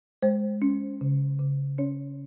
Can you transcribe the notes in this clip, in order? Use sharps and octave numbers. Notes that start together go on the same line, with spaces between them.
G#3 C5
C#4
C#3
C#3
C#4 C#5